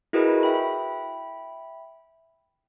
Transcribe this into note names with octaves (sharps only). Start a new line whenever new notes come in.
E4 F#4 G#4 A#4 B4 D#5
E5 G5 B5